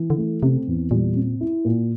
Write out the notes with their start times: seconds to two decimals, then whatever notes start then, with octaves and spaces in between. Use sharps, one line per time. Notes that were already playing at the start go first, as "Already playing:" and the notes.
Already playing: E3
0.10 D3
0.18 A3
0.43 C3 C4
0.67 E2
0.91 A#2 G3
1.16 C4
1.41 E4
1.65 A#2